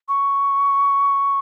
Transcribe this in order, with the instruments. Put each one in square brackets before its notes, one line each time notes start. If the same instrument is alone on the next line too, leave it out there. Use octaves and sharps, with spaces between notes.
[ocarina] C#6